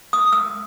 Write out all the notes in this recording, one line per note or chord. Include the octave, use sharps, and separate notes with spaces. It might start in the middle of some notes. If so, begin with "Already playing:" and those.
D#6
E6